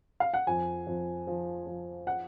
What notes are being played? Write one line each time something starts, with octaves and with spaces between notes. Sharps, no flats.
F5
F#5
F2 G#5
F2
F3
F3
F#5